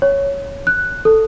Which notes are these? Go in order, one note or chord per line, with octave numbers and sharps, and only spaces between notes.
C#5
F#6
A4